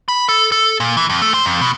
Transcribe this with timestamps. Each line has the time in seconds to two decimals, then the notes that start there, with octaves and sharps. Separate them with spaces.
0.09 B5
0.29 A4
0.52 A4
0.80 A#2
0.97 E3
1.09 F2
1.22 A3
1.34 C5
1.46 F2
1.61 B2